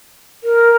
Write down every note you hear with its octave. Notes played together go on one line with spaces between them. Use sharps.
A#4